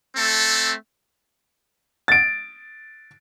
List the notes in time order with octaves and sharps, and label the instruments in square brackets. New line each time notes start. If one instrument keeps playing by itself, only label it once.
[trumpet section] A3 C4 A4
[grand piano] A6 D7